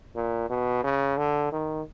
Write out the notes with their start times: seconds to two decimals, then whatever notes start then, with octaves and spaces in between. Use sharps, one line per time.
0.16 A#2
0.50 B2
0.84 C#3
1.18 D3
1.52 D#3